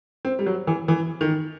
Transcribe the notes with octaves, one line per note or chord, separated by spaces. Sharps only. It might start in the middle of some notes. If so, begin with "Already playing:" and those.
C4
G3
F#3
E3
E3
D#3